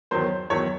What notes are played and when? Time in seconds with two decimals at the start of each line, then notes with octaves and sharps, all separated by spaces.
0.11 E2 D#3 F#3 C5
0.50 E2 D#3 F#3 C#5